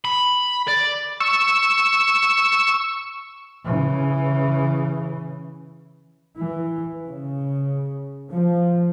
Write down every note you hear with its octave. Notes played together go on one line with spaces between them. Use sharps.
B5
D5
C#6 E6
C#3 E3
E3
C#3
F3